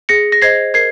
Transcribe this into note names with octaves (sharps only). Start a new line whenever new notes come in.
G#4 A#6 C#7
A#6
C5 D#5 G#6 C7
A#4 G#6 C7